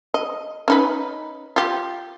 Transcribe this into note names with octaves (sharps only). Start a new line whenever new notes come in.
D#5
C#4 D#4 B4
F4 G4